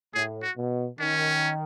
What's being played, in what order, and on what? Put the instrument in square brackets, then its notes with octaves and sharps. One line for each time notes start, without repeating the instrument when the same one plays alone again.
[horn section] A2 [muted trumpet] G#4
[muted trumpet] F#4
[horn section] B2
[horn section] D#3 [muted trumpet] C#4